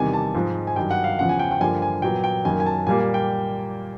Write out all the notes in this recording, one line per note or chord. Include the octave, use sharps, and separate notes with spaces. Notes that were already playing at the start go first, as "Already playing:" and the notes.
Already playing: E2 C3 D#3 G3 G#5
A5
G#2 F3 G#3 C4
G#5
G2 D#3 F#3 G5
F#5
F5
E2 C#3 F3 F#5
G#5
G5
G5
G2 D3 F3 A#3 G#5
G#5
A#2 F#3 B3 G5
G5
F#2 D#3 F#3 A#3 G#5
G#5
A5
A#2 G3 A#3 G#5
G#5
G5